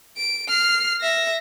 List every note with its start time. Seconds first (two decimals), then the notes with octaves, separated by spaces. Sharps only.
0.17 D7
0.48 F6 C7
1.01 E5 A#6